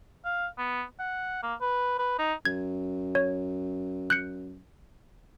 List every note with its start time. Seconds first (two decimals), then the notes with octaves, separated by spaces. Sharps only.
0.25 F5
0.58 B3
0.99 F#5
1.43 A#3
1.61 B4
1.99 B4
2.19 D#4
2.45 F#2 G#6
3.15 C#5
4.10 F#6 G6 C#7